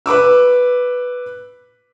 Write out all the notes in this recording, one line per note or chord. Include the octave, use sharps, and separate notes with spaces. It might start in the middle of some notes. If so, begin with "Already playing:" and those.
B4 B5 D6 E6